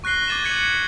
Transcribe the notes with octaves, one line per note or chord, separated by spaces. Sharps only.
C#6 F#6 A#6 C7 G7
D6 G#6 A6 D#7 E7
G#6 B6 C#7 F#7